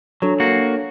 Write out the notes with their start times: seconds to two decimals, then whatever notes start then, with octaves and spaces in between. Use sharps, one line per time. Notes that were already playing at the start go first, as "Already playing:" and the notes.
0.22 F#3 D4 A4 C#5
0.40 A#3 F#4